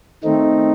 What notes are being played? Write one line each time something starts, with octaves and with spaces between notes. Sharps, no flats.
D#3 A3 C4 D#4